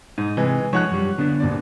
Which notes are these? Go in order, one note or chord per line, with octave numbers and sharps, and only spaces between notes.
G#2 D#4
C3 E3 G#3
F3 G#3 D#4 C#5 F#5 F#6
F#2 G3
D3 B3 D4
G#1 D#2 D5